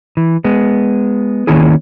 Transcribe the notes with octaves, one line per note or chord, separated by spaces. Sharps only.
E3
G#3 B3
D#3 A#3 C#4 E4 G#4